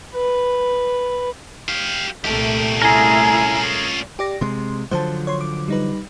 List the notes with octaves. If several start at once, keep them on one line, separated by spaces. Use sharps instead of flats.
B4
G4 F5
C2 A#2 A3 G4 A#4
C#4 E4 F4 G#4 A#4 G#5 A#5
G4 D5 A#6
C3 G#3 C6
D3 F3 F#3 C5 A5
C#5 C6
D6
G3 D#4 B4